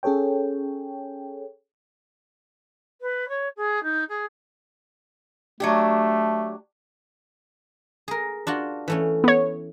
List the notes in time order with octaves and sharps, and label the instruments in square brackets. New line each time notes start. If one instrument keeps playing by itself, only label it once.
[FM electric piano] C#4 G#4 A4 C#5 G5
[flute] B4
C#5
G#4
D#4
G#4
[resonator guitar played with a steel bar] F#3 D4 G4 [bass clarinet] A3
[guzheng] G#4 A#4
D4 F4 F#4
E3 A3 C#4
[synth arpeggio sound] B3 C#5